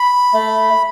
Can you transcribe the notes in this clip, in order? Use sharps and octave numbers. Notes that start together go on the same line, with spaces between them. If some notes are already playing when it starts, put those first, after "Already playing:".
Already playing: B5
A3